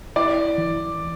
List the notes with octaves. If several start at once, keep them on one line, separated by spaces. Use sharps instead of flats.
E4 D5
E3